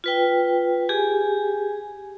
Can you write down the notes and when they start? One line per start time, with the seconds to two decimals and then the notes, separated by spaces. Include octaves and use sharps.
0.04 F4 B4 G5
0.89 G4 G#4 G#5